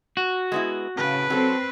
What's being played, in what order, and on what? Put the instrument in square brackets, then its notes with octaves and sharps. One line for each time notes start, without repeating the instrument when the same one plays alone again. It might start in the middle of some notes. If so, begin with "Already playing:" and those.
[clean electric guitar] F#4
[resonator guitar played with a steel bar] G#3 B3 E4
[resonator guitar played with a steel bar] A2 [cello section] C#3 [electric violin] B4
[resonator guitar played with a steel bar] F#3 A4 [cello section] C4